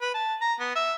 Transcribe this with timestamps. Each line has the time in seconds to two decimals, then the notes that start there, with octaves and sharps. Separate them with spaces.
0.01 B4
0.14 A5
0.41 A#5
0.60 B3
0.75 E5